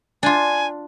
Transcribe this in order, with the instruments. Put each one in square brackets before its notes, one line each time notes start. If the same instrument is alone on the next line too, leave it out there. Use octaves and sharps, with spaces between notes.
[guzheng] D4 F4 [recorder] G#5